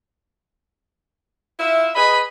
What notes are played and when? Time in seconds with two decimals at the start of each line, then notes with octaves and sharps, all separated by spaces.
1.60 E4 F4 E5
1.96 G#4 B4 D#5 B5